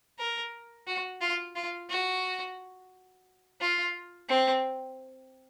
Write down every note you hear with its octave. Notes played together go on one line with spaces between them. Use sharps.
A#4
F#4
F4
F4
F#4
F4
C4